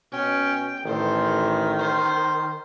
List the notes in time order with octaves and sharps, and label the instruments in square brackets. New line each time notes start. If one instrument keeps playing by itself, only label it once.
[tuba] B2 [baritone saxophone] C#4 [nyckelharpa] G5
[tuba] A1 [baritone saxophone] D#3 [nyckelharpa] A4 C5
[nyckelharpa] C5